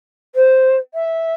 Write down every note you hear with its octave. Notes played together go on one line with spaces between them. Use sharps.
C5
E5